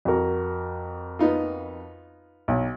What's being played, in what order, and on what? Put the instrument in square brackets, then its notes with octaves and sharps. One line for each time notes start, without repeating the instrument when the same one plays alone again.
[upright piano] F2 F#4 A#4
[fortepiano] B3 D#4 F4
[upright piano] B1